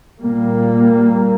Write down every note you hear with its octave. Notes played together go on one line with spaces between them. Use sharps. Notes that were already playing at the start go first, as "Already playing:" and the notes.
A#2 G3 A#3